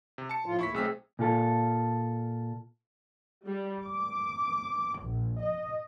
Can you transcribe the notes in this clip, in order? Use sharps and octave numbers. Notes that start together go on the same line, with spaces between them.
C3
A5 C#7
A2 F3 F4
D#2 A2 E4 C#6 B6
B1 A3 C4 G#4 E6 B6
A#2 F4 A4
G3
D6
A#1
D#5